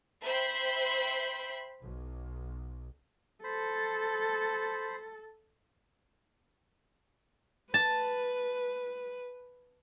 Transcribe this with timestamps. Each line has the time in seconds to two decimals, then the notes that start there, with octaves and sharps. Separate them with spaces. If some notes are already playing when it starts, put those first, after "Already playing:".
0.24 C5 E5 G5 B5 C6
1.81 B1
3.44 A4 C5 B5
7.74 B4 A5